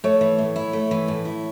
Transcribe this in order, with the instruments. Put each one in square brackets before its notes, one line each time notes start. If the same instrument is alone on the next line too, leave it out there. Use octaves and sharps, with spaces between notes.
[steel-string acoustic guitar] A3 [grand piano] C#5
[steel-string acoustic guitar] E3
A2
E4
A3
E3
A2
E4